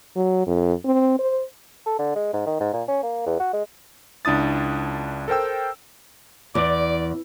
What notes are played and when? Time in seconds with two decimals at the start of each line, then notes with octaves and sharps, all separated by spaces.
0.16 F#3
0.47 F2
0.85 C4
1.19 C5
1.86 A4
1.99 D3
2.16 G#3
2.33 G#2
2.46 D#3
2.60 G#2
2.73 A#2
2.88 C#4
3.03 A#3
3.27 E2
3.40 F#4
3.53 G#3
4.25 C#2 D4 E4 D#6 A6
5.28 A4 A#4 C5 G5 E6
6.55 E2 D5